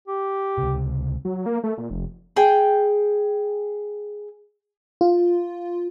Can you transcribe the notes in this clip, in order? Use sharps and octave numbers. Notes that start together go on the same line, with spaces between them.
G4
C#2 C3
F#3
A#3
A3
A#2
F1
G#4 G5
F4